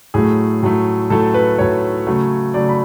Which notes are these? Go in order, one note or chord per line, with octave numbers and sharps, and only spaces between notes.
A2 F#3 A3 G#4
A2 F#3 A3
A2 F#3 A3 A4
B4
A2 F#3 A3 C#5
C#3 F#3 A3
C#3 F#3 A3 D5
B5